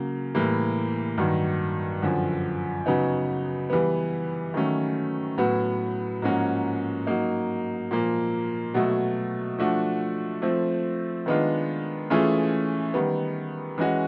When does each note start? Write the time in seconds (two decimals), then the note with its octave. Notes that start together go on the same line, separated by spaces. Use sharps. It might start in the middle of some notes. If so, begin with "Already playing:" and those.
Already playing: C#3 F#3 A#3
0.34 A2 E3 G3 A#3
1.18 G2 D#3 F#3
2.02 F#2 D3 F3
2.86 C#3 F#3 B3 D#4
3.70 E3 G3 B3
4.54 D#3 F#3 A3 C#4
5.38 A2 F#3 B3
6.22 G#2 F3 A#3 C#4 F#4
7.07 F#3 A#3 D#4
7.91 A#2 F3 A#3
8.74 B2 F#3 A3
9.58 F3 A3 D4 F#4
10.42 F3 A3 C4
11.26 D#3 G#3 B3 D4 F4
12.10 E3 A3 C#4 F4 G#4
12.94 D#3 G3 B3
13.78 E3 G#3 C#4 F#4